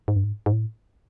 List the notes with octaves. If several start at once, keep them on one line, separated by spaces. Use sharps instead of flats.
G#2
G2
G#2
G#2
A2